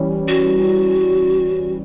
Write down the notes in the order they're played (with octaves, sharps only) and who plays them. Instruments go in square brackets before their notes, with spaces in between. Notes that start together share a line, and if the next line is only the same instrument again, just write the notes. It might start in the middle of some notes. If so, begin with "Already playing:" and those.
Already playing: [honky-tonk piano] E3 G3 C#4
[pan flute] F#4